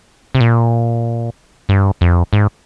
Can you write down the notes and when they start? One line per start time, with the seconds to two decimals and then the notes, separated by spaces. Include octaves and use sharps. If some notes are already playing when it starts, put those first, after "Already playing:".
0.35 C3
0.41 A#2
1.69 G2
2.01 F2
2.33 G#2